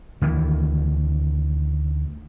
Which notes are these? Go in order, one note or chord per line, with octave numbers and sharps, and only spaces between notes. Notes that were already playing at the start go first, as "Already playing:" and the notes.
D2 D#3 E3